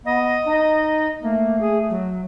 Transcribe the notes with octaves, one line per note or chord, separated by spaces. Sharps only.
B3 D#5
D#4
A3 A#3
G#4
F#3